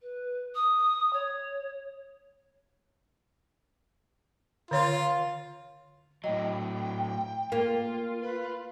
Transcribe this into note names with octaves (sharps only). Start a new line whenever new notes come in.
B4
D#6
C#5
D3 F4 C#5
A2 F#3 D#5 G5
A#3 F4
B4